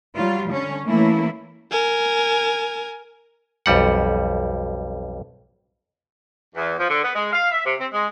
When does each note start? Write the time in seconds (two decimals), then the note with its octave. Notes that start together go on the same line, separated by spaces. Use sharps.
0.16 F#3 G3 F4
0.48 D3 C#4
0.85 E3 A3 A#3 C#4 E4
1.71 A#4 G#5
3.66 B1 F2 G3 F#5
6.55 E2
6.78 F3
6.89 D3
7.02 B3
7.14 G#3
7.32 F5
7.50 E5
7.65 C3
7.79 C4
7.91 G#3